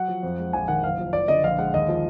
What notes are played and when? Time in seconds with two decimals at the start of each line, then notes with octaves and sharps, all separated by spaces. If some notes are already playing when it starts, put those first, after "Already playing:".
Already playing: F#3 F#5
0.08 F3
0.23 F2
0.39 G#3
0.53 A#1 G#5
0.68 D#3 F#5
0.83 F#1 F5
0.99 F3
1.13 F#1 D5
1.28 D3 D#5
1.43 A#1 F5
1.58 G#3 F#5
1.74 D#2 D#5
1.88 F3